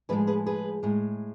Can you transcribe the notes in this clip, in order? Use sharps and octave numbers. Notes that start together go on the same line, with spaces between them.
A2 F3 G#3 G#4 B4
G#4 B4
G#4 B4
A2 G#3